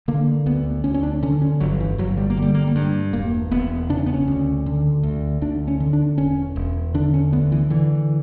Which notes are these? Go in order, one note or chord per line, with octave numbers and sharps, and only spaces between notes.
D3 A#3
D2 B3
D2 C#4
C#4
D4
D3 C#4
C#4
G1 F#3
E3
G1 F#3
G3
A#3
D3 G3
A#3
G3
G2
E1 A#3
E1 B3
C#3 D4
C#4
B3
C#4
D2
D3
D2
D2 D4
C#4
D3
D4
E1 C#4
E1
D3 D4
C#4
D2 B3
E3
D3 E3